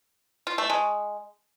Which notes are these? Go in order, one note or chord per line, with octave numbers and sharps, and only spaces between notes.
F4
A3
G#3